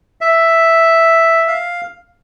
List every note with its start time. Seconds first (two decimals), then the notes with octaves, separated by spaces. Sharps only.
0.21 E5
1.48 F5